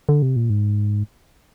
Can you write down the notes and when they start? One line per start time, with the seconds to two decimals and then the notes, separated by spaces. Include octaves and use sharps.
0.09 D3
0.22 C3
0.36 A#2
0.50 G#2